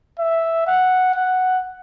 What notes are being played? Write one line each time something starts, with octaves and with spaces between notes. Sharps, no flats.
E5
F#5
F#5